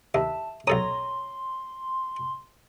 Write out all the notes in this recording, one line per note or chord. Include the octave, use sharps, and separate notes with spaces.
D#2 E5 A5
B1 A4 C#5 A#5 C6 D#6